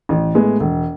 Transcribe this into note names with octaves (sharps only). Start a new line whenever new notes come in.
A1
A2 G#3 B3
E1